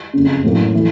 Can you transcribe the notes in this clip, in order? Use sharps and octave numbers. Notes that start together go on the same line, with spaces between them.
F#1 F2 C#3
A1 A2 F#3 A#3
E3 A3